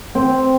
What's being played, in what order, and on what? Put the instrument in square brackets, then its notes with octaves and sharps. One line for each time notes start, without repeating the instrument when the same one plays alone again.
[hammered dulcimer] C4